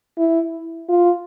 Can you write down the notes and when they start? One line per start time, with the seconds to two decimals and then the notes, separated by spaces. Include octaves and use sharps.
0.18 E4
0.89 F4